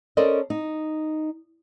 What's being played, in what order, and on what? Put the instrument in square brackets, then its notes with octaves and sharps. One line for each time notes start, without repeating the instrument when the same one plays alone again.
[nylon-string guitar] C#4 A4 A#4 C5 D5 D#5
D#4